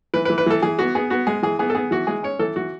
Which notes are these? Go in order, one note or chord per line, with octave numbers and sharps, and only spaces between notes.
E3 B4
B4
E3
B4
E3 A4
E3 G#4
B3 F#4
B3 G#4
B3 F#4
G#3 G#4
E3 G#4
B3 G#4
A4
B3 G#4
E3 F#4
G#3 G#4
C#4 C#5
E3 A4
E3 F#4